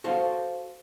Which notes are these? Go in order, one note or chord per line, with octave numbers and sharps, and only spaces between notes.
F#4 A4 C5 F5